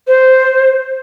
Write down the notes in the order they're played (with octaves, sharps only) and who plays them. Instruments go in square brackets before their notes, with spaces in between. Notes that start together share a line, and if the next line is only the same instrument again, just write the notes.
[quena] C5